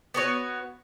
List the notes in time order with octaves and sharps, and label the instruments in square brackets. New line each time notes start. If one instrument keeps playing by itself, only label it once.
[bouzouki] B3 F#4 C#5